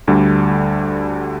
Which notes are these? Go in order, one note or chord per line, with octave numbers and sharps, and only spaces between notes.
D2 D3 G3